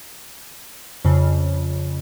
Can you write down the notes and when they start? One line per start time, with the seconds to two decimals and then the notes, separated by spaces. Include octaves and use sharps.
1.05 F2 C#3